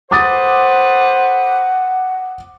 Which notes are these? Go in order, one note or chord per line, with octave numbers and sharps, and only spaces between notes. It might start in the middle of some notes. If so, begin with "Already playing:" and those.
A4 B4 C5 F#5 D6 D#6 A6